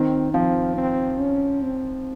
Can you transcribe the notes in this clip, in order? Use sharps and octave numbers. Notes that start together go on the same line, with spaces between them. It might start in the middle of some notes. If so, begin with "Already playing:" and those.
Already playing: D#3 C4
F3 C4
C4
C#4
C4